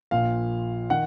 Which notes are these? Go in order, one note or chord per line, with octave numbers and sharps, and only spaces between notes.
A#1 A#2 F3 F5
D#3 F#5